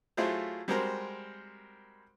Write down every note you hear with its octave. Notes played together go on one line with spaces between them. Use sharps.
F#3 A3 E4 F4 G#4 C5
G3 G#3 C4 F#4 A#4 C5